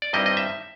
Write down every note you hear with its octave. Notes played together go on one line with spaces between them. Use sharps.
D5
G2 D#3 G3 C4 E4 D#5
D#5
E5